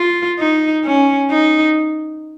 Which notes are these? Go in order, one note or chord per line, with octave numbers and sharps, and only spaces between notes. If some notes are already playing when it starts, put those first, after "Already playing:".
Already playing: F4
D#4
C#4
D#4